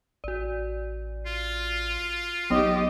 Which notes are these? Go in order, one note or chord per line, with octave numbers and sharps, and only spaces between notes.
A1 F#4 D5
F4
A#1 F#3 B3 D#4 G4 D#5